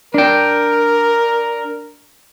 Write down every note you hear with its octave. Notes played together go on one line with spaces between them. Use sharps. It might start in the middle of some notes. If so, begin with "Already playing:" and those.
D4 A#4 G5